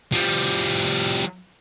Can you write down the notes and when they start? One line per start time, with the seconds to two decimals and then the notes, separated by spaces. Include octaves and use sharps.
0.12 F3 G3